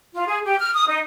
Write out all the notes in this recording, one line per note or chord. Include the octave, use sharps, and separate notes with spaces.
F4
G#4
G4
F6
D#6
D#4